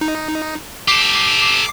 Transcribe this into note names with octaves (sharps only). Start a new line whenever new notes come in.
D#4
G4 A4 D6 C7